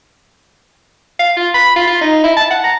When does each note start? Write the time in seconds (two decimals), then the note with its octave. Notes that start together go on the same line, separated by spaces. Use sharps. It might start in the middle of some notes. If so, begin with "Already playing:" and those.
1.19 F5
1.37 F4
1.54 B5
1.76 F4
1.87 F4
2.01 D#4
2.24 E4
2.36 A5
2.51 F#5
2.64 A#5